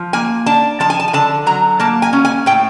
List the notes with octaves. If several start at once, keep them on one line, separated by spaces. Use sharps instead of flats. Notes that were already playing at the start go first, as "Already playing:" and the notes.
Already playing: F3
A#3 G#5
D4 A5
F3 A5
G#5
A5
G#5
D3 A5
F#3 A#5
A#3 A5
G#5
C#4
G#5
A2 G5